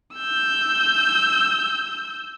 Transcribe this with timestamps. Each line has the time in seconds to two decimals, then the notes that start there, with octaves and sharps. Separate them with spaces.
0.16 E6 G6